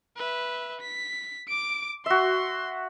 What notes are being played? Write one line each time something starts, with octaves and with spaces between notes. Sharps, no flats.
B4 E5
B6
D6 D7
F#4 E5 C6